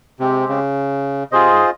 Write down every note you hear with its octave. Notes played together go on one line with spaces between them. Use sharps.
C3 G#3 C4 G4
C#3
C3 F4 G#4 C5 D#5
G#2